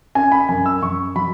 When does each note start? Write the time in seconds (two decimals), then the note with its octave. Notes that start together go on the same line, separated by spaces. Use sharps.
0.15 C#4 G#5
0.32 B5
0.49 F#2 G#5
0.66 E6
0.82 F#2 C#6
1.15 F#3 B5